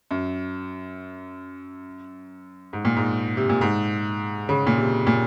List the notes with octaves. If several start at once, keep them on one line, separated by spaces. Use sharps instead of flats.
F#2
G#2
A#2
G#2
C3
A#2
G#2
C#3
A#2
C3
A#2